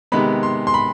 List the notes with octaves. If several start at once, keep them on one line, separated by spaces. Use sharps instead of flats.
C3 D#3 G#3 B3 B5
C6
C6
B5